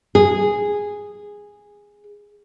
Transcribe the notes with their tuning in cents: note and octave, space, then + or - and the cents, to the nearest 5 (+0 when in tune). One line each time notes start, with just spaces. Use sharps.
G#4 -10